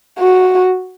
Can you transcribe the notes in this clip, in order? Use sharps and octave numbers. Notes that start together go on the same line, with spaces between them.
F#4